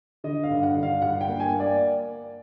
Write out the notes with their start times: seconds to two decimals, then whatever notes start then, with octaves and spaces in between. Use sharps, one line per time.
0.24 D3 D#5
0.43 F5
0.50 G2
0.63 F#5
0.76 D3
0.83 F5
1.01 G2 F#5
1.21 G5
1.28 A#3
1.40 G#5
1.53 A#3
1.60 D5